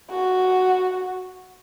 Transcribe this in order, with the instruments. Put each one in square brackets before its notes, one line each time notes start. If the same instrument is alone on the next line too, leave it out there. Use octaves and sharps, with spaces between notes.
[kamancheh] F#4